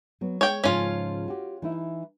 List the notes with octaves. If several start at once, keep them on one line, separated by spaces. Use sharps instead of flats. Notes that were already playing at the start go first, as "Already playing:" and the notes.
F#3 B3
G#3 C#5 G5
G#2 C#3 F3 C#4 F4
F#4 G4
E3 D#4 E4